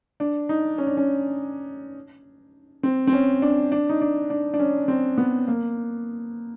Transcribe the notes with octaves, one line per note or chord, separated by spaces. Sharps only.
D4
D#4
C#4
D4
C#4
C4
C4
C#4
D4
D4
D#4
D4
D4
D4
C#4
C4
B3
A#3